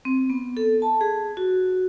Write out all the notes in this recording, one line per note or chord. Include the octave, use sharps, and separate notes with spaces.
C4
B3
A4
A5
G#4
F#4